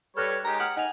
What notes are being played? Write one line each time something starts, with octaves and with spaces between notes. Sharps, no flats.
G3 A4 B4 C#5 F6 F#6 A#6
G#3 D#4 G4 A#5
F#5 D#6 F6
D#4 F#5 G#5 F7